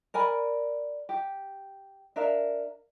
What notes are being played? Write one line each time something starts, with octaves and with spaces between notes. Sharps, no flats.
A#4 D5 G#5 B5
G4
D4 A#4 E5 F5